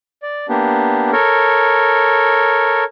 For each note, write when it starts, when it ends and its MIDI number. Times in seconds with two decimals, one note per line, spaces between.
0.23 0.46 74
0.49 1.11 58
0.49 1.11 59
0.49 1.11 62
0.49 1.11 67
1.12 2.84 69
1.12 2.84 70
1.12 2.84 73